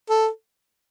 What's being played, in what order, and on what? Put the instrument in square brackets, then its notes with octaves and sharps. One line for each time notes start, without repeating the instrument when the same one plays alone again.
[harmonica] A4